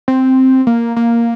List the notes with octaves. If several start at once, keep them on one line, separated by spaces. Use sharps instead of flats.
C4
A#3
A#3